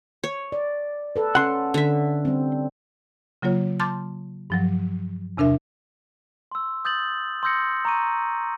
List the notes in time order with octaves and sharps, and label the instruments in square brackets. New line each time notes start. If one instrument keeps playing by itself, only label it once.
[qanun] C#5
[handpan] D5
A4 B4
[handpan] C#4 [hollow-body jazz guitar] F#5 C6
[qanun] D3 E5
[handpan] G3 C4
[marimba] C#3 F#3 A#3 F4 C#5
A5 C6 D6 F6 G6 A6
G2 F3 F#3
E2 C3 D4 A#4 E5
[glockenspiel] C6 E6
D#6 G6 A6 F#7
C6 D#6 E6 G6 A#6 C#7
A#5 C#6 D#7